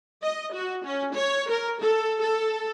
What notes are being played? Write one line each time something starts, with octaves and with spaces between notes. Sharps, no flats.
D#5
F#4
C#4
C#5
A#4
A4
A4